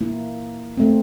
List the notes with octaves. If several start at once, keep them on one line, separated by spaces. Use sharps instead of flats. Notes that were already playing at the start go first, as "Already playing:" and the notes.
A#3 E4
A3 C4